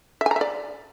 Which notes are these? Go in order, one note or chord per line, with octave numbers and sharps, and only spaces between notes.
E5
G#5
A#5
E5
D5